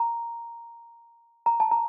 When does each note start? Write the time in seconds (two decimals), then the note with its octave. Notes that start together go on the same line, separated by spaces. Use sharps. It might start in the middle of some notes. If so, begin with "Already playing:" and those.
Already playing: A#5
1.46 A#5
1.60 A5
1.71 A#5